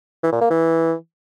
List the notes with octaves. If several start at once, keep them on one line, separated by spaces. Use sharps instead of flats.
E3
A#2
A#3
E3